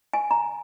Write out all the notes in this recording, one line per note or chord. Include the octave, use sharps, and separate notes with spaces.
G#5
A#5